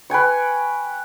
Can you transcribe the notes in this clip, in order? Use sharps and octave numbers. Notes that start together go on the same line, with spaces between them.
B4 G5 G#5 C#6